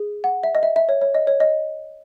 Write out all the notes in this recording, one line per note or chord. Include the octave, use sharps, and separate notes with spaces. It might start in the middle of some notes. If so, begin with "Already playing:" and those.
Already playing: G#4
F#5
E5
D#5
E5
E5
C#5
C#5
D#5
C#5
D#5